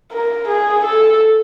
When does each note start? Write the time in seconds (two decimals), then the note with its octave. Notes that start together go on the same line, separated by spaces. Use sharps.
0.12 A#4
0.48 G#4
0.85 A4